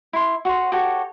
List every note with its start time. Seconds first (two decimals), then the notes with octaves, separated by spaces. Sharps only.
0.13 E4 C6
0.45 F#4 C#5 F#5 C6
0.72 F#4 G4 A4 C#5